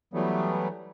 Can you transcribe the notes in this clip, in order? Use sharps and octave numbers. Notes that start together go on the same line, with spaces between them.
E3 F#3 G3 A3 B3